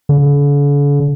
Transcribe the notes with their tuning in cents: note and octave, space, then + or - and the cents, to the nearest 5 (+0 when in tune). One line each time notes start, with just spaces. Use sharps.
D3 -45